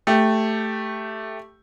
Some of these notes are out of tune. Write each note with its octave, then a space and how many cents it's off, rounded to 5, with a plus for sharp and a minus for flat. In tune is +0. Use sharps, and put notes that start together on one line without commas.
A3 +0 G4 +0